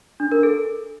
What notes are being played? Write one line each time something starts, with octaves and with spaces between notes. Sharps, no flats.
D4
A#4
A4